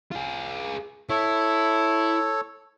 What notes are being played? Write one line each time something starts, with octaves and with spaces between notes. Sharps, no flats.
F4 G#4
E4 A4 C#5